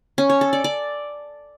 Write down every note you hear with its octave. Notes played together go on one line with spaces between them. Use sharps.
C#4
C#5
A4
D5
D5